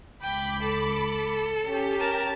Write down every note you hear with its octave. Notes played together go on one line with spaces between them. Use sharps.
C#2 G5 B5 D6
A4
C#4 G4
A#4 A5